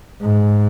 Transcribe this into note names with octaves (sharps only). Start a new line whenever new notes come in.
G#2